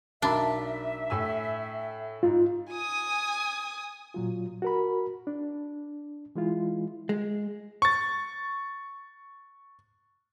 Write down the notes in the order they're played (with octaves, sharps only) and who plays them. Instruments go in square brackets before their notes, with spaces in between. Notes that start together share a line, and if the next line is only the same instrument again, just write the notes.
[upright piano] B1 A#4 B5 [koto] D4 [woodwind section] E5
[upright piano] A2 G#5 E6
[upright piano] G#2 [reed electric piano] F4
[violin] G#5 D#6
[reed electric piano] A#2 F#3 F4
F#4 A#4 B5
D4
E3 G#3 E4 F4
[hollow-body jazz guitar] G#3
[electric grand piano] C#6 A6